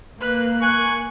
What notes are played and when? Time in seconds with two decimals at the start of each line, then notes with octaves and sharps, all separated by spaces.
0.21 A#3 B4 F#6
0.62 G#5 C#6